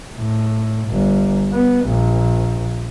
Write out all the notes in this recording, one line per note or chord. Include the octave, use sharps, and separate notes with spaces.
A2
G1
B3
A#1